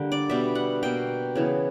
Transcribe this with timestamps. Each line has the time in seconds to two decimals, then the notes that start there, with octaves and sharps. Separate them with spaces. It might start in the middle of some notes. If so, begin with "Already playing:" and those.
Already playing: D3 G3 A#3
0.12 D5
0.29 B2 G3 B3 E5
0.55 F#5
0.83 B2 A#3 G5
1.35 C#3 E3 B3